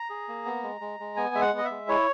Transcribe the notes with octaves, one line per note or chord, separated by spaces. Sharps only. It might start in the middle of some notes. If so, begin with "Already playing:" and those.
Already playing: A#5
G#4
A#3
B3
G#3
G#3
G#3
B3 G#5
G#3 E5
F#5
B3 D#5
E5
G#3
E4 C#5